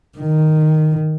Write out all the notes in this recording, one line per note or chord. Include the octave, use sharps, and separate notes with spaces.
D#3